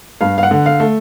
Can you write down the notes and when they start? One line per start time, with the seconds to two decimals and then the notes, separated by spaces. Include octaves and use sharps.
0.21 G2 F5
0.38 F5
0.43 F#5
0.51 D3
0.66 F5
0.80 A3